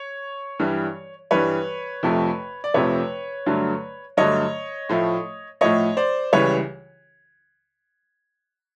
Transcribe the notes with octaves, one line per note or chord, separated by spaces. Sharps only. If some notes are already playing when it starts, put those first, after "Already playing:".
Already playing: C#5
G2 E3 G3
G2 E3 G3 B4 C#5
F2 C3 F3 A3
D5
F2 C3 F3 A3 B4 C#5
G2 D3 F#3 A3
G2 D3 F#3 A3 C#5 D#5
A2 F3 A3
A2 F3 A3 C#5 D#5
C5 D5
C#2 C#3 E3 G3 B4 C#5